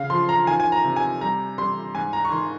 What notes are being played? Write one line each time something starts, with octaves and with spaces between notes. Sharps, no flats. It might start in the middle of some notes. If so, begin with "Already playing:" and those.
Already playing: C#3 F5
F3 C6
A#5
D#3 G#5
G#5
A#5
C3
G#5
G3 A#5
G3 C6
G#2 G#5
A#5
C#6
D#3 C6